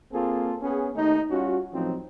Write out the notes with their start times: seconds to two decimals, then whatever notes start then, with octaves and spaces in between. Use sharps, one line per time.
0.13 A#3 C4 F4 G#4 A4
0.62 B3 C#4 G#4
0.95 D#2 A3 D#4
1.31 G3 C#4 F4 F#4
1.73 A1 F3 F#3 C4 D#4